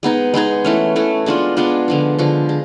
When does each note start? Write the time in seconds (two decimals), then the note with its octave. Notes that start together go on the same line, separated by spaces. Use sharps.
0.03 G#3 B3 D#4 G#4
0.34 G#3 B3 D#4 G#4
0.65 E3 A3 C#4
0.96 E3 A3 C#4
1.26 G#3 B3 D4 F4
1.57 G#3 B3 D4 F4
1.88 D3 F3 G#3
2.19 D3 F3 G#3
2.49 G#3